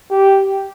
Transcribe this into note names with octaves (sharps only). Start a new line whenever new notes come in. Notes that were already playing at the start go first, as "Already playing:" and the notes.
G4